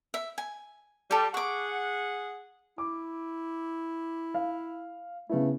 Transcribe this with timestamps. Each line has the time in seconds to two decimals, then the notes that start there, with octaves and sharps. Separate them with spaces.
0.14 E5
0.38 G#5
1.11 G3 G4 A4
1.34 G#4 F#5 C#6 D6
2.78 E4 D6
4.34 F5
5.29 C#3 A3 B3 E4